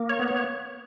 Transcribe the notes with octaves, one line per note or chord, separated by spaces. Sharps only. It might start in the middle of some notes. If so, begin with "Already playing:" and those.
Already playing: A#3
C#5
B3
C#5